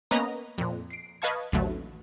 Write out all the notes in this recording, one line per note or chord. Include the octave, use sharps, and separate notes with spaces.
A#3 B3 C#4 B4 D#5 A#5
F2 A#2
C7 D7
B4 D#5 F5 A5 C#6 G#6
A1 D#2 D3 F#3 A3